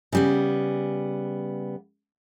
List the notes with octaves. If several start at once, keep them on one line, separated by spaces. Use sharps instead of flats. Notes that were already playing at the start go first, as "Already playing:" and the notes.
C#3 G3 B3